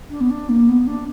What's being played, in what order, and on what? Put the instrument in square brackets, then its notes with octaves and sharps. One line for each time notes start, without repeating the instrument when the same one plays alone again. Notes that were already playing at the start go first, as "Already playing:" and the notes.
[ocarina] D4
B3
D4
A#3
B3
D4